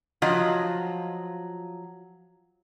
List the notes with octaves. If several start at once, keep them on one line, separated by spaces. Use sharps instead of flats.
F3 F#3 F4 D#5 A#5